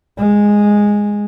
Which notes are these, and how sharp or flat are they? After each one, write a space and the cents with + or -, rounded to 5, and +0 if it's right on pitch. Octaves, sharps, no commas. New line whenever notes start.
G#3 -5